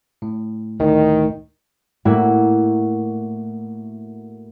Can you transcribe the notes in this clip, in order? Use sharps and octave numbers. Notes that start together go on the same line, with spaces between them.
A2
D2 A2 D#3
A2 A#3 E4 F#4